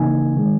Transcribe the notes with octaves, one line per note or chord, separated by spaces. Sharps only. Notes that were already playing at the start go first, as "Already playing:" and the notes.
Already playing: C#3 E3 A#3 D#4 G#5
D#3 G#3